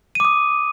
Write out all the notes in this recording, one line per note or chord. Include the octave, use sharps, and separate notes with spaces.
D6 D#6 D#7